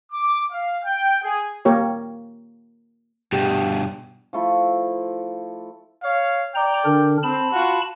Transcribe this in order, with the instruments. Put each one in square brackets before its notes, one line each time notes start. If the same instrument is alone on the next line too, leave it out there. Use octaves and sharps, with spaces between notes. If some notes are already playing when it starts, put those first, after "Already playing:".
[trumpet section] D6
F5
G5
G#4
[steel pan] A#3 G4 A#4 C#5
[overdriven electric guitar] G2 B2 [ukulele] G4
[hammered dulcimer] F3 A3 E4
[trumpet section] C#5 F5
[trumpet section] D5 G5 [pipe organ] A#5
[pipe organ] D3 D4 A#4
[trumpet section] C4 [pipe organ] A5 B5
[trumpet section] F4 F#4